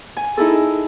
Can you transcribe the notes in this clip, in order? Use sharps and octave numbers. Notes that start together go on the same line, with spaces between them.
G#5
D#4 E4 G#4 A4